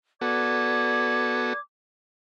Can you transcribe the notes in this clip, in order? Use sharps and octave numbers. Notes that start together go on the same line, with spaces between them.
B3 F#4 A4 D5 D6 G#6